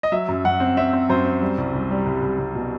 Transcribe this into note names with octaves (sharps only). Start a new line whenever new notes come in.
D#5
F#3 E5
F#2
F#2 F#5
C4
C4 E5
C4
F#2 C5
C4
G3
C2
C2
G3
C2
C2
C2
B2